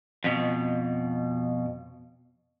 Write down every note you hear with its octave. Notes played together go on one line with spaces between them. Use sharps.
F2 B2